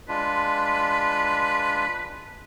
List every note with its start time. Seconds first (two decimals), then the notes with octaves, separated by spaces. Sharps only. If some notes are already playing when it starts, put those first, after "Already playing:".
0.09 G#3 D4 F4 B4